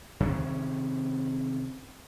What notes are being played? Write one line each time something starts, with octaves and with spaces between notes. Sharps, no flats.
C3 D#3 C#4